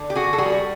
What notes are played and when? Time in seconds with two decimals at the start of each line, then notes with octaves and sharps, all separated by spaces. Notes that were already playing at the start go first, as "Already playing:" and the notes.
Already playing: D3
0.10 G4
0.16 F#4 G#4
0.33 A4
0.38 G3 F#4 G#4